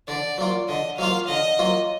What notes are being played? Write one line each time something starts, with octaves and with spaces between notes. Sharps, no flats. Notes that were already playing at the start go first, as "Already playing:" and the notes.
D3 D5
F#3 A#3 F4
D3 D#5
F#3 A#3 F4 F5
D3 D#5
F#3 A#3 F4